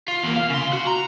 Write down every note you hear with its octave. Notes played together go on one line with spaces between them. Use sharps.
F4
E2 A#3
F5
C#3 C6
F#4
A#5